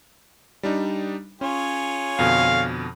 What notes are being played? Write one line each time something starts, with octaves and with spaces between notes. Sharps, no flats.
G3 D4 D#4
C#4 F4 G#4 C#5
F2 B2 D3 F5